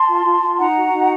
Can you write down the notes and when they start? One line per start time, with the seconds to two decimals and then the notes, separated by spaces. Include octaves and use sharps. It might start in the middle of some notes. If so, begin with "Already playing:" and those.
Already playing: A5 C6
0.08 F4
0.25 F4
0.42 F4
0.59 D#4 F#5 A#5
0.76 F#4
0.93 D#4